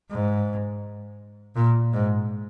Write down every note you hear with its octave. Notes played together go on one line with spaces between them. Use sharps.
G#2
A#2
G#2